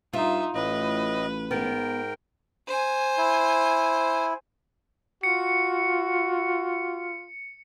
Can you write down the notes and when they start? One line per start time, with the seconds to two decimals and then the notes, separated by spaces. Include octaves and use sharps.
0.13 G2 D#4 F4 E5
0.55 A1 A2 B4 D#5
1.51 G#2 B3 A#4 G5
2.67 C5 G#5
3.17 E4
5.23 F4 F#4 C#7